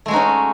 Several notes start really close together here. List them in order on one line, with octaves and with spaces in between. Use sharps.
A3 G#3 F#4 D#4 C#4